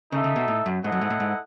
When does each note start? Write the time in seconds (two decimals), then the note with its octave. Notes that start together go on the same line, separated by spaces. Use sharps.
0.12 C#3 D#4 A4 E5
0.24 C#3
0.36 B2
0.48 A2
0.66 F#2
0.83 G#2 E4 A4 D#5 F#5
0.92 F#2
1.01 G#2
1.10 A2
1.20 G#2